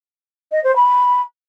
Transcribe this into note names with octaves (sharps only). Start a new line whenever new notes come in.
D#5
C5
B5